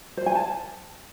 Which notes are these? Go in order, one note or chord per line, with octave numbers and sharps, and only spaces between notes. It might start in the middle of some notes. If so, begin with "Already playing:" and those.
C5
G#5
A5